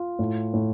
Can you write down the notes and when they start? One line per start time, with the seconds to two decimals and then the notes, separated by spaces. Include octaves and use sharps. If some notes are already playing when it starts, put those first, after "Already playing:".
Already playing: F4
0.19 A2
0.54 A2